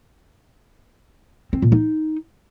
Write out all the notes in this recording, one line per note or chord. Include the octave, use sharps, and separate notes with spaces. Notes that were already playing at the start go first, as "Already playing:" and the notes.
C4
A#2
D#4